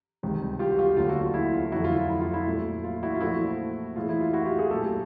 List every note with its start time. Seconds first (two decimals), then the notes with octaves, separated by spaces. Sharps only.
0.23 C#2 C3 D#3 G3
0.59 F4 G4
0.72 F#4
0.79 F4 G4
0.97 D#2 D3 F#3 A3 F4
1.09 F#4
1.22 F4
1.34 E4
1.54 F4
1.72 F2 D3 F#3 A3 E4 F#4
1.84 F4
1.91 E4
1.97 F4
2.09 E4
2.21 F4
2.33 E4
2.47 A#2 F#3 A3
2.84 F4
3.03 E4 F#4
3.15 F4
3.21 A#2 F3 A3 E4 F#4
3.96 A2 E3 G#3 F4
4.09 E4
4.21 F4
4.33 E4 F#4
4.46 F4 G4
4.58 F#4 G#4
4.70 A#2 F#3 A3 G4 A4